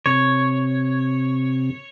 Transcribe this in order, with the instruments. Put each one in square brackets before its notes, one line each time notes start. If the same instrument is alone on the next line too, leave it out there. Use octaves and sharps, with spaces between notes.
[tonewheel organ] C3 [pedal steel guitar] C#5